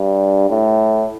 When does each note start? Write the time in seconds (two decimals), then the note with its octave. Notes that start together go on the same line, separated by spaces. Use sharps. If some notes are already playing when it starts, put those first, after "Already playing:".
Already playing: G2
0.50 A2